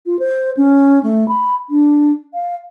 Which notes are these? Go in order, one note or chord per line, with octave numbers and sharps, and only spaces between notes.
F4
C5
C#4
A3
B5
D4
F5